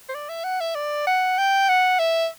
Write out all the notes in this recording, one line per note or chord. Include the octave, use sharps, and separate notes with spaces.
C5
D5
E5
F#5
E5
D5
F#5
G5
F#5
E5